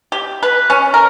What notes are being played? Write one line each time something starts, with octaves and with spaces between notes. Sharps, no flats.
G4
B4
C#4
A#4